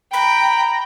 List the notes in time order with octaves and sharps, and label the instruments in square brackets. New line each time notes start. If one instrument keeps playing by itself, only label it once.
[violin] G5 [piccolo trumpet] A#5 [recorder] B5